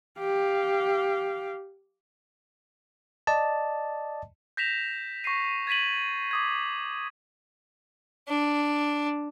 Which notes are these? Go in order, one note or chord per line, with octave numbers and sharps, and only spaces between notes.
G4 F5
D5 D#5 A5
G6 A#6 B6 E7 F7
C#6 A#6 C7 D#7
G#6 A6 B6 D#7 F#7
D6 D#6 G#6
D4